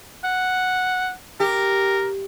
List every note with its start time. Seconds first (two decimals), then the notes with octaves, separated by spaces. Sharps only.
0.24 F#5
1.40 G4 A#4